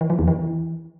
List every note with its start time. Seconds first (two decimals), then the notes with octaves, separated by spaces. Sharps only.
0.01 E3
0.10 F3
0.19 E2
0.28 E3